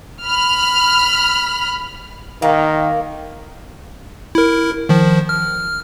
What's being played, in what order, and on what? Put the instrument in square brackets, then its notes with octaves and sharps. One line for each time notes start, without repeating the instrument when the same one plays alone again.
[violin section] B5 F6
[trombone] D#3 [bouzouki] A#3
[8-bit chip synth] E4 A#4
D#3 F3
F6